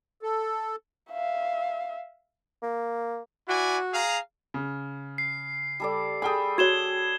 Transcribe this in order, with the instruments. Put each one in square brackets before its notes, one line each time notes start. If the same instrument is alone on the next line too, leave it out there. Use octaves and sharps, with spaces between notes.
[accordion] A4
[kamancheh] E5 F5
[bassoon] A#3
[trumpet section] E4 D5 G#5 [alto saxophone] F#4
[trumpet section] G#4 F5 A#5
[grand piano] C#3
[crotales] C7
[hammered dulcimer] G3 A4 D5
[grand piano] G#4 G5 D#6 [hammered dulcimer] A4 B5
[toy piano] F#4 C#5 [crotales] G#6 E7 G7